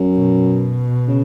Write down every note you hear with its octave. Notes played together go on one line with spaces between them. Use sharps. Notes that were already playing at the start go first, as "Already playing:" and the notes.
Already playing: F#2
B2
C#3